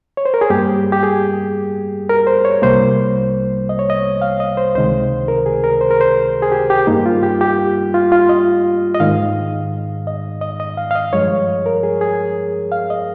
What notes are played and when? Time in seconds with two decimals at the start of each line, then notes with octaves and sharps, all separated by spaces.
0.17 C#5
0.25 C5
0.34 A#4
0.41 G#4
0.50 G2 G3 A#3 G4
0.92 G4
1.03 G#4
2.09 A#4
2.27 C5
2.45 C#5
2.62 C2 C3 G3 A#3 C5
3.69 D#5
3.79 C#5
3.90 D#5
4.22 F5
4.40 D#5
4.57 C5
4.75 C#2 C3 D#3 G#3 C5
5.28 A#4
5.46 G#4
5.64 A#4
5.81 C5
5.91 A#4
6.01 C5
6.42 G#4
6.52 G4
6.70 G4
6.87 G2 G3 A#3 D#4
7.06 F4
7.23 G4
7.41 G4
7.94 F4
8.12 F4
8.29 D#5
8.94 D#5
9.00 G#2 D#3 G#3 F5
10.07 D#5
10.41 D#5
10.60 D#5
10.77 F5
10.91 F5
10.95 D#5
11.13 G2 F3 G#3 C#5
11.66 A#4
11.83 G#4
12.01 G#4
12.72 F5
12.90 D#5